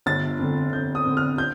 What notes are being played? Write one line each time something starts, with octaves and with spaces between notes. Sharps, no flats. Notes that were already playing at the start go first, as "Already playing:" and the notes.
G1 A6
F2 D3
G1 G6
D#6
F2 D3
F6
G6